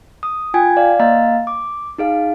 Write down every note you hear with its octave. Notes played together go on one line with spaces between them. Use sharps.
D#6
F4 G5 G#5 G#6
D5 F5
A#3 D#5 F5 A#5 A6
D6
D#4 G#4 F5